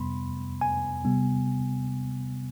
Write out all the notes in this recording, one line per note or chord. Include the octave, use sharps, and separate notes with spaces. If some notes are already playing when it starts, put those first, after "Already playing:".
Already playing: F2 C3 G3 B3 B5 C6
G#5
C3 G3 B3